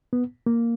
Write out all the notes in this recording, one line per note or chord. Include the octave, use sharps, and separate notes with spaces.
B3
A#3